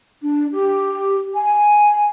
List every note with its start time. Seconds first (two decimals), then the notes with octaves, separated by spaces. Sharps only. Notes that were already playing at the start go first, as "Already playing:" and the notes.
0.22 D4
0.52 G4
1.35 G#5